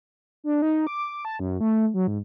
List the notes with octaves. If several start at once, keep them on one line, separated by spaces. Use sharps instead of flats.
D4
D#4
D6
A5
F#2
A3
F#3
G#2